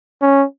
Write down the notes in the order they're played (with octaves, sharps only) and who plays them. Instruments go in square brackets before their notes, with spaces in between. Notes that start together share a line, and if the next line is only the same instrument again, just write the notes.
[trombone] C#4